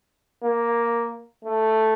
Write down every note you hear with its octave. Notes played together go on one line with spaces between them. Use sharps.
A#3
A3